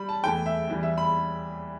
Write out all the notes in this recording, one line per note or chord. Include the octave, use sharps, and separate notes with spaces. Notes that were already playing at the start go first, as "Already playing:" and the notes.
Already playing: G3 B5
A5
E2 E3 A3 G5
E5
E2 E3 G3
E5
B5